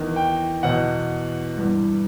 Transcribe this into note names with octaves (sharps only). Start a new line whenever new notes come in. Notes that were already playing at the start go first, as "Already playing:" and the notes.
Already playing: E2 D#3
G5
E2 B2 F#5
G2 E3